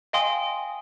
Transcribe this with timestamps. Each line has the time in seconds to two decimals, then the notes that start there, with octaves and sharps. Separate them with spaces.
0.13 D#5 F5 G5 G#5 C6 D#6